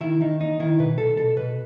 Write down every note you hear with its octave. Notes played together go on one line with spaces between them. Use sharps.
D#3 E4
D#3 D#4
D#2 D#4
D#3 E4
B2 B4
B1 A4
B2 A4
B2 B4